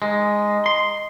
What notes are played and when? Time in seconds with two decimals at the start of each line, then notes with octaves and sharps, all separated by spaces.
0.02 G#3 D#4
0.66 C6